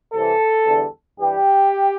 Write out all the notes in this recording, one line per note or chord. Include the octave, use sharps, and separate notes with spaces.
C2 C3 E3 A4
E2 D3 G3
G2 E3 G3 G4